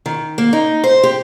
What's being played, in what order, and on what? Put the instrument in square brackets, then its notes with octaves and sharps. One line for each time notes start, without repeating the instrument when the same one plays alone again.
[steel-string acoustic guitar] D#3
A#3
D#4
C5
G4